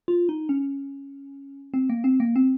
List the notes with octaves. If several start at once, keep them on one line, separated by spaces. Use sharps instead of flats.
F4
D#4
C#4
C4
A#3
C4
A#3
C4